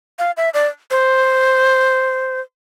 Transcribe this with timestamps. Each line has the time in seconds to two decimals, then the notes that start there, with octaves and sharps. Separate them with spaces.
0.19 F5
0.37 E5
0.54 D5
0.91 C5